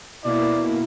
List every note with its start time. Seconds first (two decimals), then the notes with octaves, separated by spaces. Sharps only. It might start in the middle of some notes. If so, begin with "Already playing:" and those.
0.25 B2 A#3 E4 D5